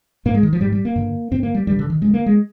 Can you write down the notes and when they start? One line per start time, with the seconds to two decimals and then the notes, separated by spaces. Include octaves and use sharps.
0.25 G#2 A#3
0.34 G#3
0.43 D#3
0.53 F3
0.61 G#2 G3
0.72 G3
0.85 A#3
0.96 G2 D3
1.32 G2 D3 C4
1.43 A#3
1.54 G3
1.67 G2 D3 G3
1.79 D3
1.90 D#3
2.02 G2 D3 G#3
2.14 A#3
2.26 G#3